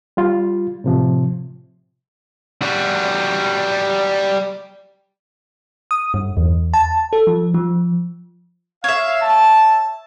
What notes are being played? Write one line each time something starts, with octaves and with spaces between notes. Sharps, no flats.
G3 F4
A2 C3 F3
G3 F#4
D#6
G2
E2
A5
A4
F3
F3
C#5 E5 F5
A5